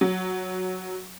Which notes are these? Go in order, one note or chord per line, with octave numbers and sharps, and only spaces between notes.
F#3